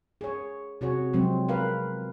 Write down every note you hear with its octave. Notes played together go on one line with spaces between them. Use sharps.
G#4 C#5
C3 F#4 G#4 C#5
C3 F3 F#3 G#3 C4
A#4 B4 F5